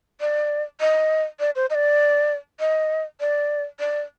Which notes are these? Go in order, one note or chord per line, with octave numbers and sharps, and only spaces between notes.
D5
D#5
D5
C5
D#5
D5
D#5
D5
D5